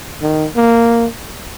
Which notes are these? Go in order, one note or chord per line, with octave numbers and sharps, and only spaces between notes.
D#3
A#3